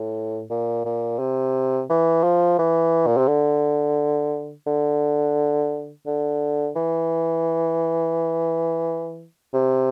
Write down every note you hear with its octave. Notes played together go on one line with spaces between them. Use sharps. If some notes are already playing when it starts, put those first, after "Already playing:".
Already playing: A2
A#2
A#2
C3
E3
F3
E3
A#2
C3
D3
D3
D3
E3
C3